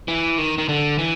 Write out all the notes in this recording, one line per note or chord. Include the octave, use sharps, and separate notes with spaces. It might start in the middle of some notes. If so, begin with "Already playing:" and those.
E3
D#3
D#3
D3
E3